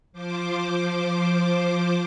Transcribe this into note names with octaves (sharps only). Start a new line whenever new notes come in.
F3 C5 D6